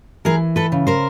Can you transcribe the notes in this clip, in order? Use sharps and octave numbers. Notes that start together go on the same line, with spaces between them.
E3 G#4 A#4
A4 B4
C#3
A#4 C5